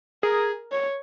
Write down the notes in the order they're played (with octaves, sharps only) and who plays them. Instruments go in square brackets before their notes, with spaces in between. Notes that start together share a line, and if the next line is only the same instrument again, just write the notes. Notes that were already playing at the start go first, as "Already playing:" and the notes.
[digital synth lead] G#4 [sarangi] A#4
[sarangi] C#5